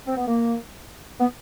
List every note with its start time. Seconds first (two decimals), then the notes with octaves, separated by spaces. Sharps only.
0.06 C4
0.17 B3
0.27 A#3
1.20 B3